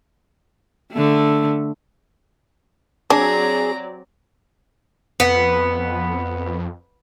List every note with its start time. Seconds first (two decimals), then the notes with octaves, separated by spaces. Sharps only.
0.93 D3 A3
3.10 F#3 C4 D4 G#4 D5 A#5
5.20 F2 B3